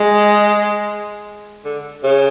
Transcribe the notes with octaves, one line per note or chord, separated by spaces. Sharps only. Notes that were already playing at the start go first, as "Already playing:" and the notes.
Already playing: G#3
D3
C#3